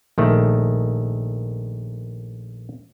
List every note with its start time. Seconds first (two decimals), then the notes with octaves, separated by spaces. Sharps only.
0.18 A#1 D#3 A3